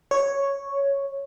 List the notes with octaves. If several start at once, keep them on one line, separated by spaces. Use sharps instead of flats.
C#5